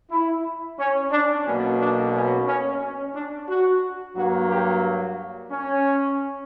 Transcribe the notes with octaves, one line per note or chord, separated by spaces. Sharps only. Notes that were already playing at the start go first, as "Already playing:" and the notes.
E4
C#4
D4
B1 B2 A#3 C#4
D4
C#4
C#4
C#4
D4
F#4
G2 F#3 A#3 F#4
G4
C#4